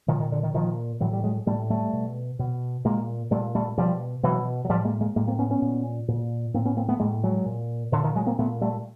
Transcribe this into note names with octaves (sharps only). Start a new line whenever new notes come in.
A#2 D#3 F3
D#3
D3
D#3
A#2 D#3 F3
A2 E3 F#3
G3
F#3 G#3
A2 G3 A3
G3 A3
B2
B2
A#2 G#3 A#3
A#2 G3 A3
G3 A3
B2 F3 G3
B2 E3 F#3
F#3
A2 F3 G3
G#3 A#3
G#3 A#3
A2 G#3 A#3
A#3 C4
B3 C#4
B3 C#4
A#2
A#2
A2 A#3 C4
B3 C#4
A#3 C4
A3 B3
A2 G#3 A#3
F#3 G#3
A#2
A#2 D3
D#3
F#3 G#3
A#3 C4
A#2 A3 B3
G3 A3